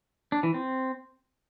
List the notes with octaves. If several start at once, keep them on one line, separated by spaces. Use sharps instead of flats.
D4
E3
C4